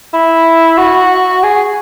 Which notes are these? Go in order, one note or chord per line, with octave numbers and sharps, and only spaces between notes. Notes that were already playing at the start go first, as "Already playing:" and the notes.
E4
F#4
G#4